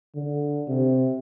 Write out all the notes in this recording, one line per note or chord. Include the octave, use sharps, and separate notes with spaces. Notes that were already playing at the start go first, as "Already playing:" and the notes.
D3
C3